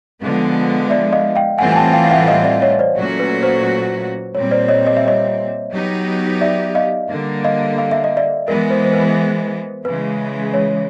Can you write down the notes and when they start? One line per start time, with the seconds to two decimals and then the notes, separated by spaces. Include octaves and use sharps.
0.21 D3 F3 G#3 B3
0.90 D5 E5
1.13 D#5 F5
1.36 F5 G5
1.58 A2 E3 G3 C4 F4 F#5 G#5
1.72 G#5
1.76 G5 A5
1.93 F5 G5
2.04 F5
2.11 E5 F#5
2.28 D#5 F5
2.45 D5 E5
2.62 C#5 D#5
2.79 C5 D5
2.96 A#2 F#3 A3 C#4 F#4
3.20 B4
3.43 C5
4.35 A#2 G3 C4 C#5
4.51 C5 D5
4.68 C#5 D#5
4.87 D#5
4.97 E5
5.08 C#5 D#5
5.73 F#3 B3 D#4 G4
6.41 D5 E5
6.75 D#5 F5
7.10 D3 G3 A#3
7.45 D#5 F5
7.78 F5
7.91 E5
8.04 D#5
8.17 D5 E5
8.48 E3 G#3 B3 A#4
8.70 C5
8.85 C5
8.93 B4
9.85 C#3 E3 G#3 B4
10.54 C#5